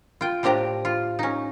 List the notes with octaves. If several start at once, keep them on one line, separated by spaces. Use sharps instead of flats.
F4 G5
A2 C4 D4 G4 A#5
F4
C#4 D#4